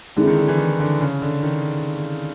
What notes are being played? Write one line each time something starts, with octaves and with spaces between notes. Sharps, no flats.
D3 G#3 C4 E4 G#4
D#3
D3
E3
D#3
D3
C#3
D3
D#3